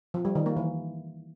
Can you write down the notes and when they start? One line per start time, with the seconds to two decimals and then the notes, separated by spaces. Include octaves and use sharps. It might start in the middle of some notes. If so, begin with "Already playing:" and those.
0.14 F3
0.25 G3
0.35 D#3
0.46 A#3
0.57 E3